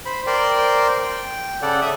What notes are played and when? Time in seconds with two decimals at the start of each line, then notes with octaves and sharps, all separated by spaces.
0.06 C5 B5
0.27 A#4 C5 D5 G5 C6 G6
1.02 G5
1.62 C#3 A4 D5 F#5
1.82 E5 D#6